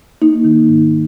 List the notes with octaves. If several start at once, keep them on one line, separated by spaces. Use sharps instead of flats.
A#3 D#4
D#3
G#2